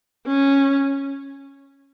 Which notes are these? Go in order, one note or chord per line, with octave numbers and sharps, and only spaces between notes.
C#4